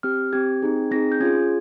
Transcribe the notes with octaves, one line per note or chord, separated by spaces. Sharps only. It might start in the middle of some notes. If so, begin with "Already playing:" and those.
C4 G4 F6
C4 G4 G#6
C4 D#4 G#4
C4 D#4 G#4 A#6
G6
C#4 F4 G#4 G#6